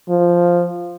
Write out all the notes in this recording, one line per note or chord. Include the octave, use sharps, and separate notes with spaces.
F3